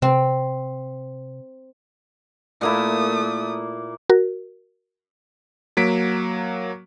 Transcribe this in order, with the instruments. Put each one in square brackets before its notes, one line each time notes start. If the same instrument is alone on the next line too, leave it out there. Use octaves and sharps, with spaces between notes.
[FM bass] C3 [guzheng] C4
[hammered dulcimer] A#2 A#3 E4 [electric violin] A3 D#6
[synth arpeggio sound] F#4 A#4
[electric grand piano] F#3 A#3 B6 D7